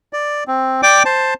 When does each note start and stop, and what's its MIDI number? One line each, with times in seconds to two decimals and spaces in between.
0.13 0.44 74
0.48 0.81 60
0.83 1.03 74
0.83 1.03 79
0.83 1.03 86
1.05 1.34 72
1.05 1.34 81